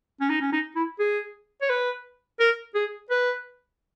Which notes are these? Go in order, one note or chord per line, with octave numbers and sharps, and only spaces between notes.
C#4
D#4
C#4
D#4
E4
G#4
C#5
B4
A#4
G#4
B4